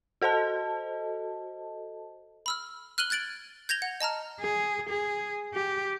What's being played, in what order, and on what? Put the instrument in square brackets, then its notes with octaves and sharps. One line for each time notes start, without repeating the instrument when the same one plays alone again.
[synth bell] F#4 A4 C5 D#5 A5
[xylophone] B5 E6 F6
F6 F#6 D#7 F#7 G7
F#6 G#6 A6 D7 F#7
G6 G#6 A#6 F7 G7
F#5
D#5 A5 A#5 F6
[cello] G#4
G#4
G4